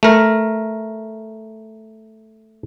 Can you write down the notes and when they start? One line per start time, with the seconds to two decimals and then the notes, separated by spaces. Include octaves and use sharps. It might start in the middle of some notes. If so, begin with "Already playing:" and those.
0.03 A3 A#4